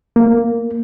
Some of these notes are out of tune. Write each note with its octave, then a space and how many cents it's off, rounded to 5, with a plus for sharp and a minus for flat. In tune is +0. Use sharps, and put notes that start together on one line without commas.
A#3 -5